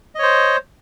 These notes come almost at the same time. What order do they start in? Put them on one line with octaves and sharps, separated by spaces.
D#5 C#5 C5